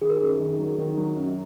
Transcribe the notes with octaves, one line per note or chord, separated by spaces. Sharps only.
D#3 G#4
A#4
F#2 G#4
D#3
F#3
D#3
F#3
F#2